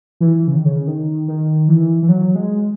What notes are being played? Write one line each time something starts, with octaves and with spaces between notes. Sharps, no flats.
E3
C#3
D#3
C#3
D#3
D#3
E3
E3
F#3
G#3